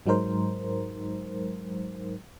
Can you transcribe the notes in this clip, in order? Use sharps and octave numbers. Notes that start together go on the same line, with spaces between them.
G#2 F#3 G#3 D#4 A#4 C5